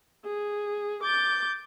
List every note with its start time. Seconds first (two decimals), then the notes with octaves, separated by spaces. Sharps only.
0.25 G#4
1.03 D6 G6 A6